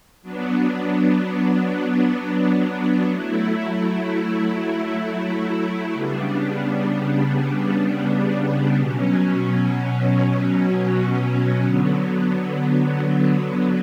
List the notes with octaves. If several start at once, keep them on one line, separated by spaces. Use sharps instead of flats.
F#3 B3 D4
F#3 A3 E4
C#3 G3 B3 D4
B2 F#3 C#4
D3 F#3 B3